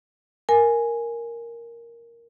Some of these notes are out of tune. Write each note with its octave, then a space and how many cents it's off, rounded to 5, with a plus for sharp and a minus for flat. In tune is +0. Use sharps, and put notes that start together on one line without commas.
A#4 +0 G#5 +0